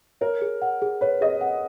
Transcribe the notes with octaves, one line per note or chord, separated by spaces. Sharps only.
A#4 C#5
G#4
F#5
G#4
B4 C#5
G#4 D#5
F#5